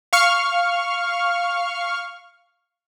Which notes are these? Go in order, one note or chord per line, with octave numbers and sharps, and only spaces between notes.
F5 C#6 F6